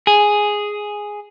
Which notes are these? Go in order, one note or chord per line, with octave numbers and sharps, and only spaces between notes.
G#4